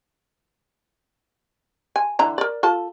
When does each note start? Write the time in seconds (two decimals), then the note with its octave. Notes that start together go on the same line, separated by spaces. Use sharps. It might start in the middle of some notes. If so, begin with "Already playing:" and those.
1.96 G#5
2.19 D3 E3 A#5
2.38 A#4 D5
2.63 F4 A4 A5